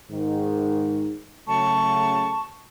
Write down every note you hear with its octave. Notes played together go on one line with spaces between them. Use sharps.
G#2 D#3
C#3 F#3 A3 A5 C#6